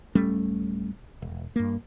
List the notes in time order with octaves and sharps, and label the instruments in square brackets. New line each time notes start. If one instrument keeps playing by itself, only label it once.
[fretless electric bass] D1 G3 A3 C#4
E1
G2 A#3